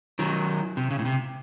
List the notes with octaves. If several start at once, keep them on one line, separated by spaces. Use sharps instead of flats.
D#3 F#3
C3
C#3
A2
C3